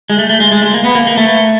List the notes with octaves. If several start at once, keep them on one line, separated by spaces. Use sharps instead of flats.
G#3
A3
A3
G#3
G#3
G#3
A#3
B3
A#3
A#3
A3